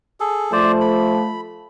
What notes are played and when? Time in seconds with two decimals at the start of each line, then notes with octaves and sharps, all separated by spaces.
0.20 G#4 A4
0.52 F3 A3 C5 D5
0.81 B5